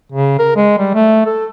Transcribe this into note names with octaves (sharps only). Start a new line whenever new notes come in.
C#3
A#4
G#3
G3
A3
A4